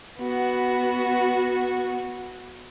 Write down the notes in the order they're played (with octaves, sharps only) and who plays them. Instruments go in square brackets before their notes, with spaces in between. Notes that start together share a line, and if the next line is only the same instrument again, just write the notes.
[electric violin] B3 F#4